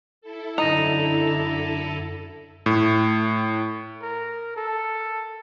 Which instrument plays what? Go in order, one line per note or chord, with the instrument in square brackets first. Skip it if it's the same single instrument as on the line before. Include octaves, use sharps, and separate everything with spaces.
[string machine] E4 A4
[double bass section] F#2 D3 [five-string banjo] D#4 [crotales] A#6 D#7 F7
[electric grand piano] A2
[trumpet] A#4
A4